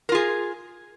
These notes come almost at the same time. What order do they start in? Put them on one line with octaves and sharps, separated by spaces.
A#4 F4 G#4